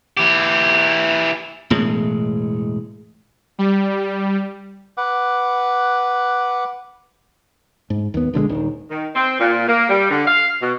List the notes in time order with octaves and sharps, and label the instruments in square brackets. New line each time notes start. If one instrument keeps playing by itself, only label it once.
[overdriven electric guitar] E3 G4
[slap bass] E1 A2 G#3
[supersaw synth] G3
[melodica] B4 F#5 D6
[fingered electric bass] G#2
D#2 B3
A#1 D3 F#3 G#3
D#1 D#3
[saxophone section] D#3
C4
A#2
A#3
G3
D3
F5
B2